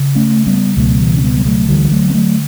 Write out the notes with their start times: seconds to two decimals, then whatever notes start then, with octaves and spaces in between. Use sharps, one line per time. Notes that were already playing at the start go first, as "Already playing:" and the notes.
Already playing: C#3
0.15 A3 C#4
0.46 G3 B3
0.77 C#2 B2 F#3 A3
1.00 E3 G3
1.17 C#4
1.22 G3 B3
1.37 G3
1.46 F#3 A3
1.69 D2 D3 E3 G3
1.91 F#3 A3
2.10 B3
2.14 F#3 A3